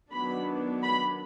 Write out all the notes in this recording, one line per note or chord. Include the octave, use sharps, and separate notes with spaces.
D#3 F#3 B3 D4 B5
B5